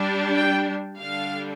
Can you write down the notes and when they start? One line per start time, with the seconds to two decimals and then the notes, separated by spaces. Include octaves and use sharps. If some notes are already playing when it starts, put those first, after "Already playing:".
Already playing: G3 D4
0.36 G5
0.98 D3 G3 D4 F5